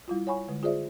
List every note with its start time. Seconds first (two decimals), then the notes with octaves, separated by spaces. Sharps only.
0.08 G3 E4 F4
0.27 C#5 F#5 G#5 B5 C#6
0.48 D3 G#3
0.63 F4 G#4 C5 D5 E5